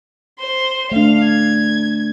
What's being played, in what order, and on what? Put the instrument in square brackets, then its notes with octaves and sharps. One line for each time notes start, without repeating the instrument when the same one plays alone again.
[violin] C5 C6
[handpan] A3 D4 [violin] F5
[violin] G#6